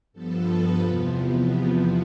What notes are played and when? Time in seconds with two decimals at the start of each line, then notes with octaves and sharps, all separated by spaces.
0.13 G2 F3 B3 A4
0.47 B4
0.81 E2 C3 F3 B3